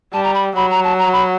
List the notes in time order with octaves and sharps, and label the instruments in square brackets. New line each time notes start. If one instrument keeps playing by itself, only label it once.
[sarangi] G3 [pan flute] A5
[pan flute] A#5
B5
[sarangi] F#3 [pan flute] B5
[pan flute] A#5
A5
A#5
B5